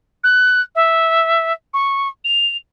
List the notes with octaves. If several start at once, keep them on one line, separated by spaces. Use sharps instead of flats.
F#6
E5
C#6
F7